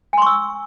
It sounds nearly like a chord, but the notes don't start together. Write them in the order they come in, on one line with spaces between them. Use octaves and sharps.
G#5 C6 C#6 E6